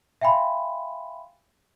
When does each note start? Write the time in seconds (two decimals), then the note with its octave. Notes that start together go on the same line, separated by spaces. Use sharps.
0.21 E5 F5 G5 G#5 B5 C6